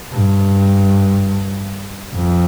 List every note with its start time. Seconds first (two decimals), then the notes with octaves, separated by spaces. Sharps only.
0.12 G2
2.15 F2